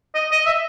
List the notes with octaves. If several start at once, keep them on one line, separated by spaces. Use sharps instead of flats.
D#5
D#5
E5